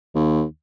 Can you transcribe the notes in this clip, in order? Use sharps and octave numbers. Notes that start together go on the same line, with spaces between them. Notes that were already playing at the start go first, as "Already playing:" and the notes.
D#2